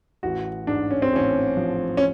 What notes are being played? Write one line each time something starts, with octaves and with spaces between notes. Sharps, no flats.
A1 F#4
G#2 D4
C#4
C4
A1 C#4
F3
C#4